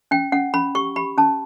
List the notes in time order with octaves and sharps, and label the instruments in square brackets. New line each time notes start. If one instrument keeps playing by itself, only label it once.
[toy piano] C#4 G5
C#4 F#5
C#4 B5
G4 C#6
G4 B5
C#4 A5